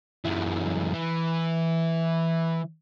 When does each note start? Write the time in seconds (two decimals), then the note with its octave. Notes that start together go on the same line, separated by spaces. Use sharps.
0.25 F#2 E3
0.94 E3